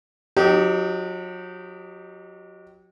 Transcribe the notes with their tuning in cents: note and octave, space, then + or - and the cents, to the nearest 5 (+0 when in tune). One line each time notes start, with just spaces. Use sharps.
F#3 -35 D#4 -5 G4 -20